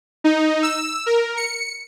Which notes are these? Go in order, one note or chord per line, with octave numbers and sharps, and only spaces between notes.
D#4
E6
A#4
C#7